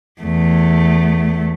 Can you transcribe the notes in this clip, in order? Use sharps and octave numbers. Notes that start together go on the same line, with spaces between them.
E2 A3